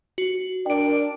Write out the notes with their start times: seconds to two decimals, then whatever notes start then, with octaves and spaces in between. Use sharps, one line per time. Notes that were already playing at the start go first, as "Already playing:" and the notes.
0.18 F#4
0.66 D4 A#4 D5 G5 D7